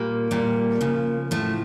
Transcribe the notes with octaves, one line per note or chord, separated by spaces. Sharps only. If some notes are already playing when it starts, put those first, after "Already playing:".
Already playing: A#2 G3 A#3
A#2 G3
C#3 F3
A2 F3 A3